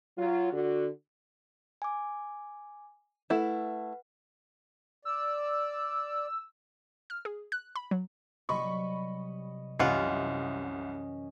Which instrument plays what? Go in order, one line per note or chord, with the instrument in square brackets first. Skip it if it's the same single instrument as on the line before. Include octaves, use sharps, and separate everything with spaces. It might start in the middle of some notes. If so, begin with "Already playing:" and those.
[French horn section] F#3 F4
D3 F#4
[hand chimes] G#5 D6
[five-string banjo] A3 E4 [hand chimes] B4 F#5
[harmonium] D5 [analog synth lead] E6
[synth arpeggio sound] F6
G#4
F#6
B5
F#3
[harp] C3 F#3 G3 [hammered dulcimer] D#5 [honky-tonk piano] B5 C#6
[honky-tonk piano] C2 [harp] F#2 E3 [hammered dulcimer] C#4 D#5 [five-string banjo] E4 F4 F#5